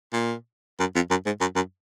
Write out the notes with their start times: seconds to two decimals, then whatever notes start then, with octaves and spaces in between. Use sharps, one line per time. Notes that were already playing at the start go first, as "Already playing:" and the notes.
0.13 A#2
0.80 F#2
0.95 F2
1.10 F#2
1.26 G#2
1.41 F#2
1.56 F#2